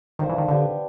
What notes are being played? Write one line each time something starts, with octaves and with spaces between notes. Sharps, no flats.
D#3 D4 F4 A4 C5
E3
D#3
D3 B3 D4 G4